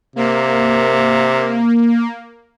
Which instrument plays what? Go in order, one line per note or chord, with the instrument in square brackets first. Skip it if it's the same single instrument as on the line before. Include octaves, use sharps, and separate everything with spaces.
[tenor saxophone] C3 [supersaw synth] A#3